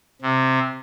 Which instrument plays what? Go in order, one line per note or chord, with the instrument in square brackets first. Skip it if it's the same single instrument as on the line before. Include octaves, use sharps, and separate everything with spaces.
[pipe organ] C3